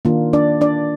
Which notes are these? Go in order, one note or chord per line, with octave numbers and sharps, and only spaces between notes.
D#3 A#3 D4 F4
D4 D5
D4 D5